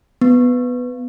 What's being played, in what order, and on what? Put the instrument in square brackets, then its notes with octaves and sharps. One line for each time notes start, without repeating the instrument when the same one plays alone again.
[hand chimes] B3